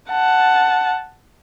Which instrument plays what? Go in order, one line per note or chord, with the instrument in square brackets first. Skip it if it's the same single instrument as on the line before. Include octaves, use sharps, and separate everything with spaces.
[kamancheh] F#5 A5